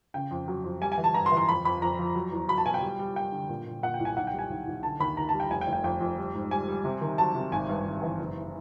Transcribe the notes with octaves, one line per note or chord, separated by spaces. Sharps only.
C#3 G5
F2
F#3
F2
G3 G#5
G#5
E3
A5
G2 A#5
C6
E3
C6
F2 B5
F2 B5
F2 A#5
F3
F#3
E2
F#3 B5
A5
B2 G#5
G5
G3
G3
G3 G5
D3
A#2
A#2
A#2 F#5
G5
C2
G#5
B1 F#5
G5
G3
G#5
B1
B1
D3 A5
D#2 B5
D#2 A#5
G3 A5
G5
F1 G#5
G5
F1
G5
F2 G5
F2
G3
G#2
G3 G#5
G3
C3
D#3
F#3 A5
C3
G#1 G#5
G2
G#1
E3
F#1